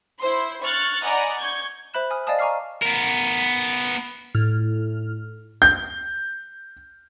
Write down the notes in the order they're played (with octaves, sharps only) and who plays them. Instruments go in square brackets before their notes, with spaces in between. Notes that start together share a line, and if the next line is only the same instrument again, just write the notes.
[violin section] E4 C5 C6
C#6 F6 F#6 A6
D5 D#5 F#5 G#5 A#5 B5
C#6 G6 G#6
[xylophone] C5 E5 B5 F#6 E7
G#5 D#6 F6
D5 D#5 F5 G#5 A5 D#6
G#5 A#5 C#6 D6 F6 C7
[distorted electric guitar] B3 A#4
[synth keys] A2 F6
[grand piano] G6